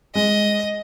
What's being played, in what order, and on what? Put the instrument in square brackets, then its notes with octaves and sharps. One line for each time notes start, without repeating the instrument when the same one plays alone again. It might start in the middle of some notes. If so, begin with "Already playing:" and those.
[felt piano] G#3 [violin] D#5